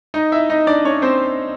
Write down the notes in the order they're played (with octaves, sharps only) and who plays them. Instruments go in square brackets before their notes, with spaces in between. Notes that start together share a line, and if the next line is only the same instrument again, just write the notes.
[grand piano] D#4 D#5
E4 E5
D#4 D#5
D4 D5
C#4 C#5
C4 C5